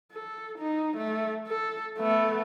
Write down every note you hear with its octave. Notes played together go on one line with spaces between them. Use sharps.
A4
D#4
A3
A4
A3 B3